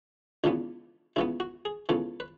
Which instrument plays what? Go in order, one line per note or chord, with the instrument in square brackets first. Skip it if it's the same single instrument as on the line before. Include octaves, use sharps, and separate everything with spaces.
[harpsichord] C#2 C#3 E3 B3 D4
C#2 C#3 E3 B3 E4
F#4
G#4
C#2 C#3 E3 B3 A4
B4